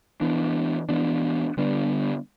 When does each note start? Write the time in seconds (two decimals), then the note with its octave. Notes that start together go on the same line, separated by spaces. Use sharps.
0.21 E3 B3 D4
0.89 E3 B3 D4
1.57 D3 G3 B3 D4